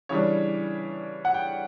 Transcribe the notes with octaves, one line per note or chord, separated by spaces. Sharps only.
C#3 E3 G3 D4 C#5
F#5
G5